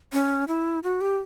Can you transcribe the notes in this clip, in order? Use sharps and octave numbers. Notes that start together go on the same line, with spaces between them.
C#4
E4
F#4
G4